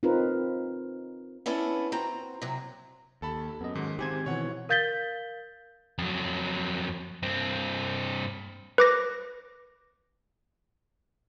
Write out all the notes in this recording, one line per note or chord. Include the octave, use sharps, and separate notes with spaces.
C4 D#4 F4 A#4 B4
B3 C#4 D4 E4 A4
C4 F#4 A#5
C3 F#3
D#2 A4 A5 B5
F#2 B3 D#5
G#2 D#3 G#3
G#2 D#3 C4 G4 C5 G#5 G#6
B2 E3 C#5 F#5
A#4 F5 G6 A6 B6 G7
F2 F#3
G2 C4
B4 D6 A#6